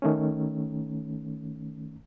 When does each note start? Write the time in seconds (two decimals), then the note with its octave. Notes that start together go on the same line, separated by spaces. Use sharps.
0.02 D#3 A3 C#4